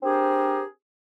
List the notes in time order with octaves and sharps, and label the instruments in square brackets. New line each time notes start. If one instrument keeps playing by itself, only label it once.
[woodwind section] C4 D4 G4 G#4 A#4 C5